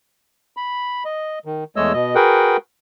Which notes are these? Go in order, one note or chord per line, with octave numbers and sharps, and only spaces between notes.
B5
D#5
D#3
E2 G#3 A3 C#5 D#5 E6
B2 D#5
F#4 G#4 A#4 B4 F#5 G5